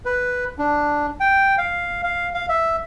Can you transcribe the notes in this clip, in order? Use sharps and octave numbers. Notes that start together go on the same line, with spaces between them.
B4
D4
G5
F5
F5
F5
E5